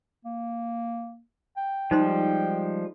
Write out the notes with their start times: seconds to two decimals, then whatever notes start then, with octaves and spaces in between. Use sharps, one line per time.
0.25 A#3
1.57 G5
1.91 F3 G3 G#3 D#4 C5 C6